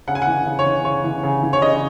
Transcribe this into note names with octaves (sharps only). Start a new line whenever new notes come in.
C#3 F#5
G#5
F#5
E3
C#3
C#5
E3
C#3 C#5
E3
C#3
E3
C#5
C#3 D#5